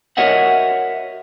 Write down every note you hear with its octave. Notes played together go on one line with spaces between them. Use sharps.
F#4 A#4 C#5 D#5 E5 F#5